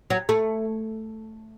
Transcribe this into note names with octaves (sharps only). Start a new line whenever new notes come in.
F#3
A3